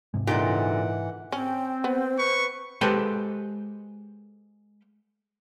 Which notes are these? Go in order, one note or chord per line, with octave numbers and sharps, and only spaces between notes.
G#2 C3 G#3
A#2 D3 E3 D#4 G4 F#5
C4 C#4 G5
B3 C5
B4 C#6
G#3 G4 A4 B4 C5 G5